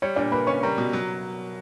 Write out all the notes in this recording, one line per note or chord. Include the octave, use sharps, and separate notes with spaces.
G3 C#5
A#2 D4 D5
A#3 B4 B5
C#4 C#5 C#6
G3 A#4 A#5
B2
F#3